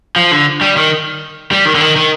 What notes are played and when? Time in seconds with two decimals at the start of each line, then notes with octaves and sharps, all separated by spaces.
0.16 F3
0.32 D3
0.61 G3
0.77 D#3
1.52 G3
1.65 D#3
1.75 D3
1.81 D#3
1.96 D#3